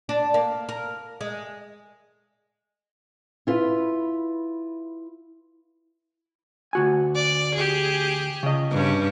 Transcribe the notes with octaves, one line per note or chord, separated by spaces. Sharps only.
D4
A#3
A#4
G#3
E4 F4 B4
D2 F#4 G#5
D5
G4 G#4
C#3 D#5
G2 C#4